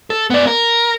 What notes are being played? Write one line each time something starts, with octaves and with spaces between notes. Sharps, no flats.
A4
B3 D5
A#4